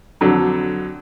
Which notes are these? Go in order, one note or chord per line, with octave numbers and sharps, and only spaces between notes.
F2 D3 F#3